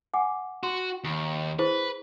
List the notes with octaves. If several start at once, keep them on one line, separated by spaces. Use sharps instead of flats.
F#5 G#5 D6
F#4 C6
D#2
E4 G#4 B4 C5